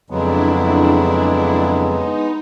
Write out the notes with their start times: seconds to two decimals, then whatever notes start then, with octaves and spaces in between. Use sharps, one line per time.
0.10 F2 C#3 F#3 G#3 B3 D4 E4
1.88 D#4